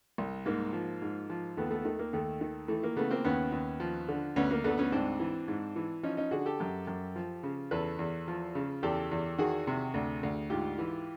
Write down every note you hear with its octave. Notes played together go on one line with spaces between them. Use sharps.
C2
G#2 A#3
F3
G#2
F3
D#2 A3 B3
A3 B3
D#3 A3
A#3
D#2 A3
D#3
E3 A3
A#3
C#3 A3 B3
A#3 C4
D#2 B3 C#4
D#2
F3
D3
D2 B3 C#4
A#3
D2 A3 B3
B3 C#4
G#2 C4 D4
E3
G#2
E3
F3 C#4 D#4
C#4 D#4
D3 F#4 G#4
G4 A4
F#2
F#2
F3
C#3
E2 A4 B4
E2
F3
C#3
E2 G4 A4
E2
D#3 F#4 G#4
C3
D2
D2
G#2 F4 G4
E3